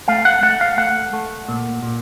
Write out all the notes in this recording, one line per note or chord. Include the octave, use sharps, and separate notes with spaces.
A3 F5
F#5
A3 F#5
F5
A3 F#5
A3
A#2
A#2